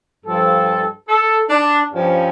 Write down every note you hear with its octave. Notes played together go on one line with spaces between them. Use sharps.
G2 F3 A4
A4
D4
G2 F3 C#4